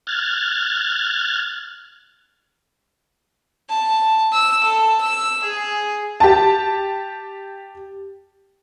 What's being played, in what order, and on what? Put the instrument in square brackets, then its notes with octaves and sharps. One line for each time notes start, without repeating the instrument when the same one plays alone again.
[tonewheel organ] F6 F#6 G#6 A6
[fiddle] A5
E6
A4
E6
G#4
[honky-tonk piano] G4 A5